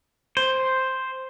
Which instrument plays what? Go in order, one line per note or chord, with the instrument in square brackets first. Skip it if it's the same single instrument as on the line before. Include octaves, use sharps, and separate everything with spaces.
[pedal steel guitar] C5